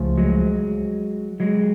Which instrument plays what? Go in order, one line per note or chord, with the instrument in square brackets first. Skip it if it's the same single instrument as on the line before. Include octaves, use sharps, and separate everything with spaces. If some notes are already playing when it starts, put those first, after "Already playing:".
Already playing: [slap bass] C#2 C#3 F3 A3
[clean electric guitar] F#3 G#3
F#3 G#3